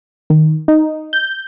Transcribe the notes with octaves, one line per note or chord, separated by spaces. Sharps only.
D#3
D#4
G6